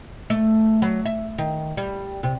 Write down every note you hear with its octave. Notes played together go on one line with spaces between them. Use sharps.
A3
F#3
E5
D#3
G3
C3